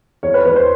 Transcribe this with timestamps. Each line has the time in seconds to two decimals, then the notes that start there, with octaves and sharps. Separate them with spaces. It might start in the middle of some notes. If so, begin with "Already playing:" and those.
0.23 E2 C#5
0.34 B4
0.45 E2 B4
0.56 C5